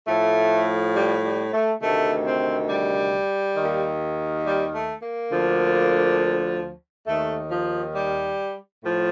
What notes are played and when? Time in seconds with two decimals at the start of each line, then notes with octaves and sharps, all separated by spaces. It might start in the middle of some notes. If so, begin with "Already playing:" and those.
0.07 A2 F3 A3
0.95 G3
1.24 G3
1.53 A3
1.82 D2 C3 D#3 A3
2.26 C4
2.69 G3
3.57 D#2 D#3
4.44 G3
4.73 A3
5.02 A#3
5.32 D2 D3 F3
7.07 D#2 D#3 A3
7.50 F3
7.94 G3
8.82 A2 F3